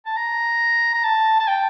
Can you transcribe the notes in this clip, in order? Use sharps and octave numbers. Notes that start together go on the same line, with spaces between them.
A5
A#5
A#5
A5
A5
G5